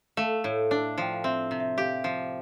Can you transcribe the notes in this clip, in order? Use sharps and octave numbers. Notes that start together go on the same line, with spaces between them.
A3 F5
A2
D4
F3 G5
F5
C4 E5
C3
E5
G4 F5
F3